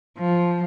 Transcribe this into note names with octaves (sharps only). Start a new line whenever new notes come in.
F3